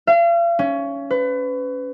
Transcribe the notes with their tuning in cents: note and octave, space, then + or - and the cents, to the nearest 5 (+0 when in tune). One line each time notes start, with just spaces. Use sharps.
F5 -40
C#4 +15
B4 +30